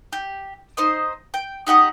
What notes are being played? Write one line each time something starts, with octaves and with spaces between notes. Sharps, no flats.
G4
D#4 C5 D#5
G5
D#4 G4 F#5 D#6